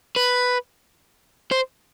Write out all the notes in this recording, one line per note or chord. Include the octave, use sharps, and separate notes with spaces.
B4
C5